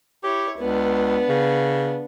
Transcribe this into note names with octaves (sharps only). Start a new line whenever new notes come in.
E4 G4 C#5
C#2 B3 D4
C#3